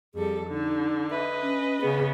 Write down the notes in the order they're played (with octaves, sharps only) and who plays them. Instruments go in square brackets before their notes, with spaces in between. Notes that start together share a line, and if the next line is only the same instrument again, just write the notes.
[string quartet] F2 G3 A4 [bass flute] G#4
[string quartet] D3 [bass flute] D#4
[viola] B4 D#5 [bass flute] E5
[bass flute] C#4
[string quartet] C#3 B3 [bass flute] G#4